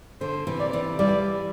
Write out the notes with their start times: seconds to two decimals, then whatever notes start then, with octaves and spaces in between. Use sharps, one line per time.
0.21 D3 C5
0.47 C3 E3
0.60 D5
0.73 C3 E3
0.99 E3 G3 D5